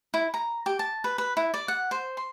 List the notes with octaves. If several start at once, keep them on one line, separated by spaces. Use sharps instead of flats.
E4
A#5
G4
A5
B4
B4
E4
D5
F#5
C5
C6